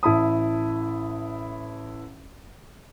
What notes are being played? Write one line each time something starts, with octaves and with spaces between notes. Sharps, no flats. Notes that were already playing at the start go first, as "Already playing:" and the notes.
A1 E4 A5 B5 D#6